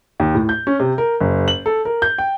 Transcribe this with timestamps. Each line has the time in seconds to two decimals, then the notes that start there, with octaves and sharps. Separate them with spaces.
0.20 D#2
0.35 A2
0.49 G6
0.67 C#4
0.80 C3
0.98 A#4
1.21 F#1
1.48 F#7
1.66 A4
1.85 A#4
2.02 G6
2.18 G5